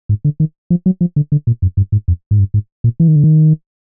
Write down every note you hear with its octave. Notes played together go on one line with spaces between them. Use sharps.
G#2
D3
D#3
F3
F#3
F3
D3
D3
A#2
F#2
G2
G#2
F2
G#2
G2
G#2
A#2
E3
D#3
D3
D#3